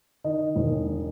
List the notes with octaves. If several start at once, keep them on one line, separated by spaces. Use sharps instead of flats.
D#3 D#5
E1